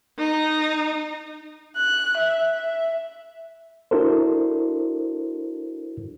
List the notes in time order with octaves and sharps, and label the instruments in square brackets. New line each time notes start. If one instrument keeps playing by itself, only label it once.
[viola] D#4
[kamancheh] F#6
E5
E5
[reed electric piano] D4 E4 F#4 A4 A#4 C5